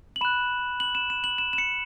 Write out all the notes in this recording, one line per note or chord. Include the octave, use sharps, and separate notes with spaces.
F#7
B5 F#6 E7
F#7
E7
E7
F#7
E7
E7
C#7